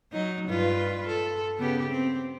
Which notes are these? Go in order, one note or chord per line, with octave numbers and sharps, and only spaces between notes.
F#3 D#4
G2 F4 B4
A4
C#3 B3 G4
C4